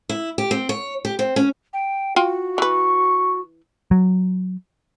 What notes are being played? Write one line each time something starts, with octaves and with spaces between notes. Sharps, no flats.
E4
G4
C4
C#5
G4
C4
C#4
G5
F4 F#4 F5 G5
E3 B4 C#6
F#3